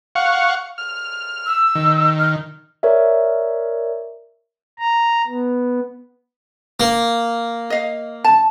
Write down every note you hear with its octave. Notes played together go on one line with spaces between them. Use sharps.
F5 F#5 C#6
F6
E6
D#3
F6
A#4 C#5 D5 E5
A#5
B3
A#3
D#5 F5
A5